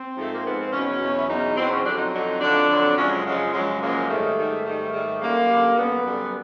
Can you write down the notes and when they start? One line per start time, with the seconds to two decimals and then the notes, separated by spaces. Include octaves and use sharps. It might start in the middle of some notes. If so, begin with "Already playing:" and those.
Already playing: C4
0.16 G#2 F3 G#3 A3
0.32 A#3
0.44 G#2 F3 G#3 B3
0.59 C4
0.72 E2 B2 F#3 C#4
1.00 E2 B2 F#3
1.19 E4
1.28 E2 B2 F#3 D#4
1.56 E2 B2 F#3 C4
1.71 C#4
1.84 F2 D3 F#3 D4
1.97 D#4
2.11 F2 D3 F#3
2.40 F2 D3 F#3 D4
2.68 F2 D3 F#3
2.96 F#2 C#3 F3 G#3 C#4
3.25 F#2 C#3 F3 G#3
3.52 F#2 C#3 F3 G#3
3.80 F#2 C#3 F3 G#3 A#3
4.08 G#2 D#3 G3 A3
4.36 G#2 D#3 G3
4.65 G#2 D#3 G3 A3
4.92 G#2 D#3 G3
5.20 F#2 D3 G3 A#3
5.49 F#2 D3 G3
5.76 F#2 D3 G3 B3
6.05 F#2 D3 G3